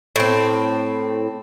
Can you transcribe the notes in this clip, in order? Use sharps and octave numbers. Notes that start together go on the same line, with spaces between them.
A2 C4